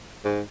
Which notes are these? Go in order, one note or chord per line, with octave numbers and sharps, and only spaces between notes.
G#2